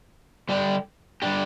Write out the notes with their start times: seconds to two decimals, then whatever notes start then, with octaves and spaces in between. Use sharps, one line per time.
0.49 D3 G3 D4 G4
1.22 D3 G3 D4 G4